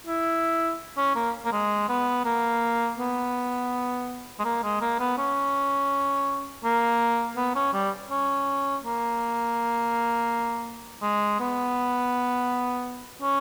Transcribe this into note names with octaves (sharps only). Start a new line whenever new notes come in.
E4
C#4
A#3
A#3
G#3
B3
A#3
B3
G#3
A#3
G#3
A#3
B3
C#4
A#3
B3
C#4
G3
C#4
A#3
G#3
B3
C#4